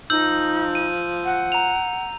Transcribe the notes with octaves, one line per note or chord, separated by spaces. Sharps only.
F3 D#4 E6 G6 F#7
D#7
F#5
A#5 F7